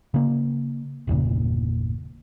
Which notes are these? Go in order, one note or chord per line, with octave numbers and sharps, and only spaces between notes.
C#3 A#3
G1 E2 A#2 C#3